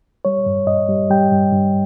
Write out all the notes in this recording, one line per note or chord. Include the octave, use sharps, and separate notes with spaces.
G3 C#5
G2
G2 D#5
G3
G3 G5
G2
G2